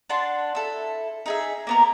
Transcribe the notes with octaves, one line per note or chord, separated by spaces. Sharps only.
D4 F#5 A5 C6
E4 A4
D#4 G#4 E5
A#3 B3 A#4